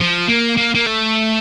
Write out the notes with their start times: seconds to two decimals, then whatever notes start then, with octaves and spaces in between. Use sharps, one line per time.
0.01 F3
0.29 A#3
0.57 A#3
0.75 A#3
0.86 A3